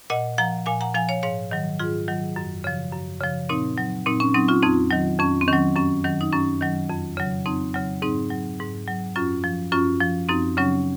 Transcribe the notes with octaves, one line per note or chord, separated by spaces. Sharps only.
A#2 D#5 F#5
F3 F#5 A#5
A#2 F5 G#5
F#5 A#5
F3 F5 G#5
C#5 F5
G#2 C#5 F5
D#3 F#3
G#2 F4 G#4
D#3 F#3
F#2
C#3 F3
F#2
C#3 F3
A#2 C4 D#4
F#3
A#2 C4 D#4
C#4
F#3 C4 D#4
C#4 F4
F2 C4 D#4
D#3 F#3
F2 C#4
C4
D#3 F#3 C#4
F#2 C#4
D#3 F#3
D#4
F#2 C#4
D#3 F#3
F2
C#3 F#3
F2 C4 D#4
C#3 F#3
G#2 C4 D#4
F#3
G#2
F#3
F#2 C#4 F4
F3
F#2 C#4 F4
F3
F#2 C4 D#4
C#3 F#3 C#4